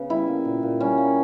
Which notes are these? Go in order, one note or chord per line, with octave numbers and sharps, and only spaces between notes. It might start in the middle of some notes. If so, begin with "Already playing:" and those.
Already playing: C#3 B3
G3 E4
A#3
A#2
A#2
G3 C#4
A#3